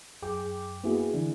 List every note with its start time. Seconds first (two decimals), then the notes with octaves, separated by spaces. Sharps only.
0.22 F#2 G#4 G5 D6
0.84 A#3 B3 E4 F#4 G#4
1.13 D3 E3 D4 E4